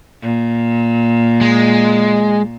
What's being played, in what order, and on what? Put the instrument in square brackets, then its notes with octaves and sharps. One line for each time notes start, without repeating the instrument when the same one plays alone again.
[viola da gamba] A#2
[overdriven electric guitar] G#3